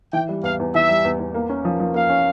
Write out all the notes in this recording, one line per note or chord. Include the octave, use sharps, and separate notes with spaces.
E3 G5
G3
E2 F5
E2
E3 E5
G3
E2
E2
A#3
C#4
F3
F3
A#3 F5
C#4